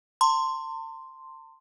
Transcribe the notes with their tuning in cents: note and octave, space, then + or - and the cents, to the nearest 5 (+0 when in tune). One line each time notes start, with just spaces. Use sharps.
A5 +45 C6 +0